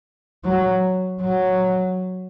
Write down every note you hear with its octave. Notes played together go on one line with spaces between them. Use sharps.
F#3
F#3